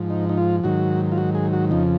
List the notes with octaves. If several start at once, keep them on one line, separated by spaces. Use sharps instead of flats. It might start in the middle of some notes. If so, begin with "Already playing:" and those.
Already playing: G#2 F3
D#4
D#4
F4
G#2 D#3 F#3 F#4
F4
F#4
G#4
F#4
F2 C#3 F3 D#4